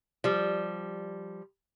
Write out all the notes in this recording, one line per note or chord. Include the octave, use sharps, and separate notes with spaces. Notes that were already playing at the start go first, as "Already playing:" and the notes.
F3 G3